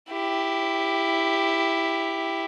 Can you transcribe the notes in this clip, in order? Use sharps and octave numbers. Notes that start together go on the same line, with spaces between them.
E4 G4